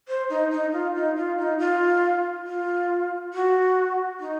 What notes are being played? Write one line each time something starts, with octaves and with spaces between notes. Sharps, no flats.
C5
D#4
D#4
F4
D#4
F4
D#4
F4
F4
F#4
D#4